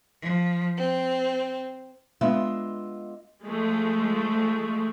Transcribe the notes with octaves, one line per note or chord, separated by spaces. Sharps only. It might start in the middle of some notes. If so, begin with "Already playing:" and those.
F3
C4
G#3 B3 D4 F4 D#5 E5
F3 G#3 A3